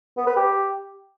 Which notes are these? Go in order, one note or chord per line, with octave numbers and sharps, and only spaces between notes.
B3
B4
G4